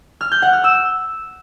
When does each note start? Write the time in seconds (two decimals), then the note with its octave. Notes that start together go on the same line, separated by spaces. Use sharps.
0.21 F6
0.32 G6
0.42 F#5
0.53 F6
0.64 E6